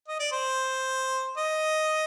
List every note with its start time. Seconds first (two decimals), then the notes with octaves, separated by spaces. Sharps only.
0.08 D#5
0.20 D5
0.32 C5
1.37 D#5